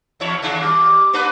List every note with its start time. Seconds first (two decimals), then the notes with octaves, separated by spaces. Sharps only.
0.20 E2 E4 C#5
0.42 D#2 C#3 D4
0.61 G3 D6
1.13 A#3 D4 B4